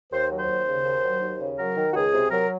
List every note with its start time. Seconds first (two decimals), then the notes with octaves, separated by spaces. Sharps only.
0.12 D#2 C5
0.30 F#3
0.39 C5
0.48 D#2
0.67 C#3
0.85 D#2
1.04 F#3
1.21 D#2
1.40 C#3
1.58 F#3 A#4
1.77 D#3
1.91 F#4
1.95 C#2 G#4
2.14 C3
2.31 F#3 A#4